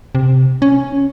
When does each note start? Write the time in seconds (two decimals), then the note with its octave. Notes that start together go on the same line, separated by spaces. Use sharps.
0.15 C3
0.62 C#4